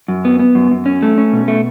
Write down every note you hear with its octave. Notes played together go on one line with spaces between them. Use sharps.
F#2
B3
B3
F#2
F#2
C#4
A3
C#4
B2
A3